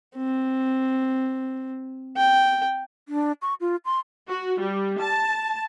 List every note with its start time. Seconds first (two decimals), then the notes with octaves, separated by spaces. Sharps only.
0.16 C4
2.17 G5
3.09 D4
3.42 C#6
3.61 F4
3.85 C6
4.28 F#4
4.61 G3
5.01 A5